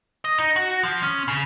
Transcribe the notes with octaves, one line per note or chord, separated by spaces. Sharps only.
D#5
D#4
F#4
F3
C#4
C#3